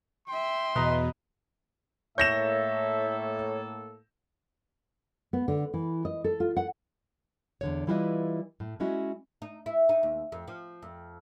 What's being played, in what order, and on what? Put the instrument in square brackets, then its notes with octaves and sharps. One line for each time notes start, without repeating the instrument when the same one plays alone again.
[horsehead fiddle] E5 G5 [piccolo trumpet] C6
[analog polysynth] E2 B2 [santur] B4 D#5 A#5
[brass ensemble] A2 A#3 A4 [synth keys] C#5 [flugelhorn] E5 [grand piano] G6 A#6 E7
[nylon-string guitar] B3
D3
E3
D#5
A4
F4
F#5
E2 D3 C#5
E3 G3 E4 F4 B4 D#5
A2
G#3 C#4 E4 F#4 D#5
[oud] D#4
E4
D#4
D#2
F2
F3
F2